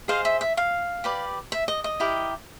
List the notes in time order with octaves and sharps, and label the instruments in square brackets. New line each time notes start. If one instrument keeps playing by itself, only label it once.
[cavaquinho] G#4 C5 D#5 F5
E5
E5
F5
G4 B4 D5
E5
D#5
D#5
E4 G4 A#4